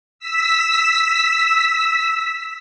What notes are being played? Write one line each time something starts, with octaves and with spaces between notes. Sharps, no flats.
E6 B6